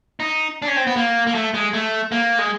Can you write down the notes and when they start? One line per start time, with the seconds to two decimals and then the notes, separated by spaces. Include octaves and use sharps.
0.20 D#4
0.62 D4
0.68 C#4
0.76 C4
0.87 B3
0.96 A#3
1.27 A#3
1.35 A3
1.54 G#3
1.73 A3
2.12 A#3
2.39 G#3